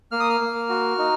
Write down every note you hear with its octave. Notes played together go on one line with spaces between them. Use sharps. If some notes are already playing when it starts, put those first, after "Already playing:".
A#3 F6
D#6
F6
A#3
F#4
D#4